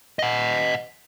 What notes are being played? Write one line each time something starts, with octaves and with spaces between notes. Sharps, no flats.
D#5 F#5